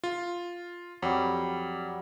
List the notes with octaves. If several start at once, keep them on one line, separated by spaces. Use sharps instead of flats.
F4
F2 F#3 G3